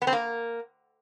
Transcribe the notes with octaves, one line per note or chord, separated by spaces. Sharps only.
B3
C4
A#3